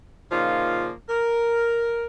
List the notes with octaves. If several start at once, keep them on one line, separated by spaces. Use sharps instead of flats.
A#2 C#3 F3 A#3 D#4 F4
A#4